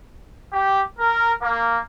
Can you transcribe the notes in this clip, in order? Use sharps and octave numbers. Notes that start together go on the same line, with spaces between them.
G4
A#4
A#3